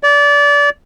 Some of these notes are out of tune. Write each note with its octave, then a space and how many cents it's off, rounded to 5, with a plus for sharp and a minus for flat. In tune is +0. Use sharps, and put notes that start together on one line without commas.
D5 -25